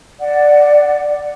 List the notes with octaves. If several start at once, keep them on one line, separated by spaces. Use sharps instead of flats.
D5 F#5